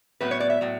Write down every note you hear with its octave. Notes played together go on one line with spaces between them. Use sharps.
A2 F#3 B3 B4
C#5
D5
E5
A2 F#3